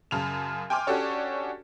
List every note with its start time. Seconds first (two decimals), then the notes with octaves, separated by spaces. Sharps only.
0.11 F#2 C#3 A5 F7
0.70 G5 G#5 C6 D6 F6
0.87 C#4 D4 F#4 G4 A4 C#5